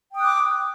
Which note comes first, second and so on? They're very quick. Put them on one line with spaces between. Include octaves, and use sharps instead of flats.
G5 D#6 F#6 D6